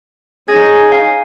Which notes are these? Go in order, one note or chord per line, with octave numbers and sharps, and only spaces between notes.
C#4 D#4 G#4 G#6 A#6
F5 G#5